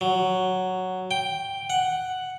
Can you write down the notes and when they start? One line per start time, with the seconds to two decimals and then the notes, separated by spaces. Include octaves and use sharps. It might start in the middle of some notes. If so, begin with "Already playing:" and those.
0.01 F#3
1.11 G5
1.70 F#5